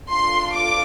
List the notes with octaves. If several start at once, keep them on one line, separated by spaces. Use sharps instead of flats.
D4 F4 A4 C6
D6